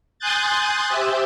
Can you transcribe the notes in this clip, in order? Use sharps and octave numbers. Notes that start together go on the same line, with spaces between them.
G#5 C6 D#6 F#6 G6 A6
G4 C5 E5